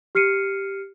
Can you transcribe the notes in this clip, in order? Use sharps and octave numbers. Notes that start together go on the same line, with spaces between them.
G4 F6 C7 C#7 D#7